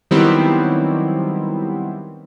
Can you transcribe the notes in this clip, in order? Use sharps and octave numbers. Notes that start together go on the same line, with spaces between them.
D#3 F#3 G3 B3 C4 E4